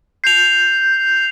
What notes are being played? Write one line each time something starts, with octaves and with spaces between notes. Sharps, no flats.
G6 C7 F7